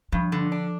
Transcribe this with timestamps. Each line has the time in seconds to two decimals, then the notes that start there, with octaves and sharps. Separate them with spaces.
0.12 G2 F3
0.32 D3
0.52 D4